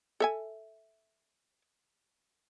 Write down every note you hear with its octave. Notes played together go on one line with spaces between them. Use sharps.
A4 E5 G#5